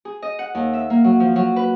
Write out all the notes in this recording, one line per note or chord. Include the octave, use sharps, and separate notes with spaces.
G#4
D#5
F#5
D#2
E5
A#3
F#3
F3
F#3
B4